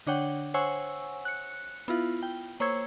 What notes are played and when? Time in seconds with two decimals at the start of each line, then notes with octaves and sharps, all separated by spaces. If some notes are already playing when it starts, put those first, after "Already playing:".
0.07 D3 D4 C#5 F#5 G5
0.54 C5 C#5 F#5 G#5 C#6 E6
1.25 F#6 C#7
1.88 B3 E4 F4
2.23 G5
2.60 A#3 C5 C#5 C#6 E6 G#6